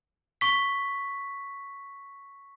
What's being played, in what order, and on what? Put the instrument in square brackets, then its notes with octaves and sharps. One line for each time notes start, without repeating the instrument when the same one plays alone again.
[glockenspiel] C#6 B6